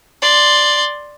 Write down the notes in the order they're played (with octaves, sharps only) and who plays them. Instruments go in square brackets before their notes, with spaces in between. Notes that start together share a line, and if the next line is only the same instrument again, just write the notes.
[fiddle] D5 C6